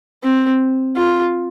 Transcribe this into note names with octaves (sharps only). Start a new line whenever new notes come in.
C4
F4